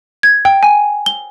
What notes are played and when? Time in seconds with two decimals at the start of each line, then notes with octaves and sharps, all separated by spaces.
0.23 G#6
0.45 G5
0.63 G#5
1.06 G7